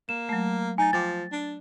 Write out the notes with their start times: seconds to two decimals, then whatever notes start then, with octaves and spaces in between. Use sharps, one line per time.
0.09 A#3 E7
0.29 F#3 A3
0.78 D#4 G#5 A6
0.93 F3 G5 G#5 D6 A6
1.31 D4